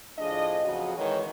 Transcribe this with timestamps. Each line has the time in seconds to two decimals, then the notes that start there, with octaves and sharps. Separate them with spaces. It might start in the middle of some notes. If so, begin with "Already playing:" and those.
0.19 A2 F3 D4 G#4 D#5
0.65 F2 C#3 F3 F#3 F#4
0.98 D#3 E3 G#3 C#5